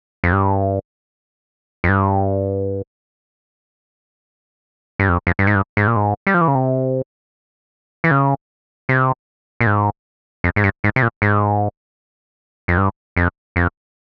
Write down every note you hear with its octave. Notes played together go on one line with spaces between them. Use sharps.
F2
G2
F2
G2
G2
F2
F2
G2
G#2
G2
G#2
A#2
G#2
G3
F3
E3
C#3
C3
E3
C#3
C3
A#2
G#2
F2
G#2
G2
G#2
C3
A#2
G#2
F2
G2
F2
F2